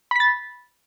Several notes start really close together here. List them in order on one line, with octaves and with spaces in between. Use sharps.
B5 B6 A6